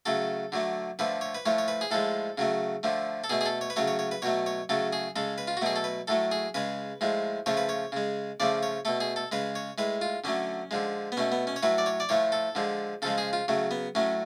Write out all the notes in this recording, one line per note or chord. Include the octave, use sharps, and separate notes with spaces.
C#3 F#3 A3 A4
D3 F#3 A3
D3 F3 A3 B4
C#5
B4
A2 F3 A3 C#5
C#5
B4
G#4
A2 F3 G#3 A4
C#3 F#3 A3
D3 F3 A3
A4
B2 A3 G#4
G#4
A4
C#5
B4
C#3 F#3 A3 C#5
C#5
C#5
B4
B2 F#3 A3 C#5
C#5
C#3 F#3 A3 A4
G#4
C#3 G#3 A4
B4
F4
F#4
B2 F#3 A3 G#4
A4
B4
A2 F#3 A3 A4
G#4
C#3 G#3 B4
A2 F3 G#3
C#3 F3 A3 C#5
B4
C#5
C#3 G#3
C#3 F3 A3 D5
C#5
B2 A3 A4
G#4
A4
C#3 G#3 B4
C#5
A2 G#3 B4
F4
D3 F#3 A3 C#4
D3 F3 G#3
B3
B2 A3 C#4
B3
C#4
C#5
A2 F#3 A3 B4
D5
C#5
D5
A2 F3 A3 C#5
A4
D3 F3 G#3
C#3 F3 G#3 A4
G#4
F4
C#3 F#3 A3
B3
A2 F#3 A3 C#4